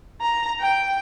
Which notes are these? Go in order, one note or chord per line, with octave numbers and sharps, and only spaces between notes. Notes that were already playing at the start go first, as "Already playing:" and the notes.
A#5
G5